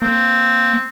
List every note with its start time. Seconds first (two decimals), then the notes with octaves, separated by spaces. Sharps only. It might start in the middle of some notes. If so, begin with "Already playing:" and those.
0.02 A#3 C4